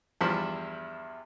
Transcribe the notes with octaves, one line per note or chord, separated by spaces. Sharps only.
E2 G2 F3 E4 E5